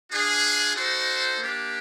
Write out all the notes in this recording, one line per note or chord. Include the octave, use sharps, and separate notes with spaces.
D4 F4 G#4
D#4 F#4 A4 C5
A#3 D4 G4